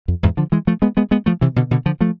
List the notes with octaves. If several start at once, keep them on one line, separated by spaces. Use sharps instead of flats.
F2
E2 G#2
D3 F3
E3 G#3
F3 A3
G#3 B3
G#3 B3
G#3 B3
F3 A3
C3 E3
B2 D3
B2 D3
D3 F3
F3 A3